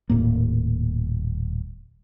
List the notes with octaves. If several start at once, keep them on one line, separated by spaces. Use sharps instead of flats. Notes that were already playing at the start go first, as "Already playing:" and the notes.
D#1 A2 A#3